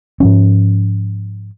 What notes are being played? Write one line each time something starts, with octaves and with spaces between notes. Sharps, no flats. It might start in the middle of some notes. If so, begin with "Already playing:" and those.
G#2 F3 C#4